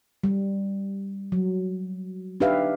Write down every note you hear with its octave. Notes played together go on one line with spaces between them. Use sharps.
G3
F#3
D4 D#4 G4 B4 E5 F5